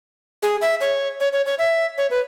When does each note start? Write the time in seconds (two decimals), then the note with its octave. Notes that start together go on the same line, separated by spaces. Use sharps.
0.43 G#4
0.61 E5
0.81 C#5
1.20 C#5
1.33 C#5
1.46 C#5
1.59 E5
1.98 C#5
2.10 B4